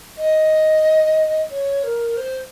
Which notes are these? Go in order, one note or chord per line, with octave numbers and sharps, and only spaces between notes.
D#5
C#5
A#4
C5